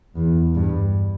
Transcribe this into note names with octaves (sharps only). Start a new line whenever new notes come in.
E2
G2